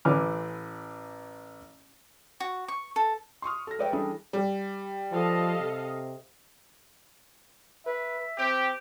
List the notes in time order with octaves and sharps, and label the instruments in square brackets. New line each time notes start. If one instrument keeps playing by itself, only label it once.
[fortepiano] A1 E3 G#5 D6 F6
[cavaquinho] F#4
C#6
A4
[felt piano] C6 C#6 D#6 F6
A4 A#6
G#3 B4 C#5 D5 E5 G5
E3 G3 C#4 D4 G#4 A4
[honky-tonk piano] G3
[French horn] F3 [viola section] A4 D#5 F5
[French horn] C3
[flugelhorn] B4 [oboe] E5
[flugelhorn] C4 [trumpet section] G4